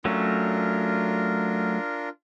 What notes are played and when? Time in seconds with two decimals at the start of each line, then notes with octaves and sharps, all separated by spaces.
0.05 F#3 A3 C#4 D4 F4 A#4